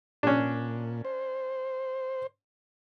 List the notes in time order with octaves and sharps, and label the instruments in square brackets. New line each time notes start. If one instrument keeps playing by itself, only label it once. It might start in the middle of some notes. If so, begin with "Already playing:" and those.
[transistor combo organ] A#2 [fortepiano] C#4 D4
[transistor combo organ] C5